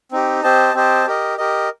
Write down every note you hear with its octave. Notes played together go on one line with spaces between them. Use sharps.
C4 D#4 G4
C4 G4 C5 D#5 A5
C4 G4 C5 D#5 A5
G4 A#4 D#5
G4 A#4 D#5